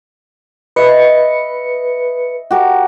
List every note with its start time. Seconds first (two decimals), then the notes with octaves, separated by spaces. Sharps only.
0.76 B4 D#5 E5 C#7
2.51 F#4 G4 A#4